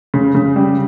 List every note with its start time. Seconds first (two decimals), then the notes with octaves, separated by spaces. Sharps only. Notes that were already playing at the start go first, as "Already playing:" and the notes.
0.14 C#3
0.35 C#3
0.56 G3